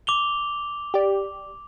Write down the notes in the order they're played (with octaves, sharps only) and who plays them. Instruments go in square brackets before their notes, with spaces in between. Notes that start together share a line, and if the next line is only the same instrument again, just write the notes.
[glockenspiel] D6 F7 G7
[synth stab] G4 D5